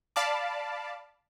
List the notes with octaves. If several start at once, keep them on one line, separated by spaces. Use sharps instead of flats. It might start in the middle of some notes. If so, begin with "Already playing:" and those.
D5 F5 A5 B5 D6